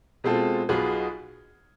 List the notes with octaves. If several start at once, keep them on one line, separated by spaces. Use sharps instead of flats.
B2 G#3 C4 F4 A4
B1 B2 B3 F4 G#4